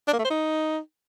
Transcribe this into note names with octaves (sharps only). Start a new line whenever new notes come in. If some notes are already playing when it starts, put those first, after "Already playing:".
D4
A#3
A3
C5
D#4